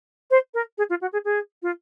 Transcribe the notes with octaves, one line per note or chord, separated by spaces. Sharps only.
C5
A#4
G#4
F4
F#4
G#4
G#4
F4